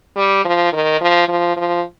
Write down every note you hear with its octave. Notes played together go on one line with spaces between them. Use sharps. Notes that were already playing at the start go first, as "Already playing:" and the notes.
G3
F3
D#3
F3
F3
F3